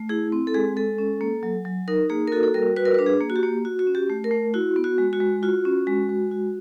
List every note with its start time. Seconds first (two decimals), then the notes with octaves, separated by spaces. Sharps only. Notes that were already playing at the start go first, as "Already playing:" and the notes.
Already playing: A3
0.09 E4 G#4
0.32 C4
0.47 A4
0.54 G#3 G#4
0.76 G#3 A4
0.98 C#4
1.21 A#3
1.43 F#3
1.65 F#3
1.88 D#4 A#4
2.10 A#3 G#4
2.28 A#4
2.32 F#4 A4
2.43 A4
2.54 G3 A#4
2.76 F#4 B4
2.85 A#4
2.94 B4
2.99 D4
3.06 G#4
3.21 A#3
3.30 F#4
3.36 G4
3.43 A#3
3.65 F#4
3.79 F#4
3.87 C#4
3.95 G4
4.09 A3
4.24 A#4
4.31 A3
4.54 E4 F#4
4.76 B3
4.84 F#4
4.98 G#3
5.13 F#4
5.20 G#3
5.43 F4 F#4
5.65 C#4
5.87 G#3
6.09 G#3
6.31 F#4